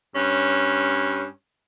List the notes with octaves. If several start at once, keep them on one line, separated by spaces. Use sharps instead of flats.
G2 C#4